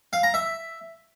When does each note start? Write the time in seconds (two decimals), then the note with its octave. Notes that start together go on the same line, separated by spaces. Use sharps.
0.13 F5
0.23 A#5
0.34 E5